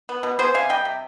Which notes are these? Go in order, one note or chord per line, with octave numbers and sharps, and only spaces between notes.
B3
B2
B3 G#4 C5
C3 F5 G#5
G3 D#5 G5
C3